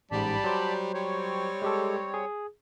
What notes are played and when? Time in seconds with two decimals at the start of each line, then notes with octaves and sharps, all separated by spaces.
0.11 A1 G#2 G3 D5 A5 B5
0.44 F#3 C5
0.94 G3 C4 C#5
1.62 G#3 G4 A4
2.14 G#4